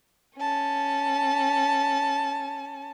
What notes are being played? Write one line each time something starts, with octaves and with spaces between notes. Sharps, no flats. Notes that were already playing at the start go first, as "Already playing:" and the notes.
C#4 A5